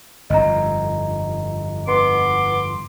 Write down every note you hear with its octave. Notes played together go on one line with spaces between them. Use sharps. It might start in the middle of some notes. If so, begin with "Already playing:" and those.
G1 F2 D#5 A#5
B3 C6 D6